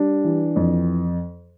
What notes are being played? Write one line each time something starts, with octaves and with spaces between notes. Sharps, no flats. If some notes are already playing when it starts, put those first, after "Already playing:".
Already playing: G3 D4
E3
F2